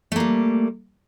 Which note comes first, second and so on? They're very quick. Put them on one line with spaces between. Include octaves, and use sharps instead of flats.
A3 A#3 G3